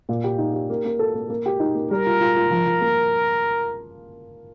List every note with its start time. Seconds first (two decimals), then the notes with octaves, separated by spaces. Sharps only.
0.09 A#2
0.24 G4
0.38 D#4
0.54 G4
0.70 A#3
0.85 A#3
0.99 A4
1.15 A#3
1.30 A#3
1.46 G4
1.60 D#4
1.75 A#3
1.91 G3 A#4
2.06 F4
2.21 F4
2.36 F4
2.51 F3
2.66 F3
2.81 A#3